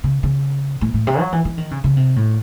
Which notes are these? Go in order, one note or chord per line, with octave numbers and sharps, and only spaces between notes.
C#3
C#3
A2
A2
C3
F#3
E3
E3
D#3
C#3
C#3
C3
A2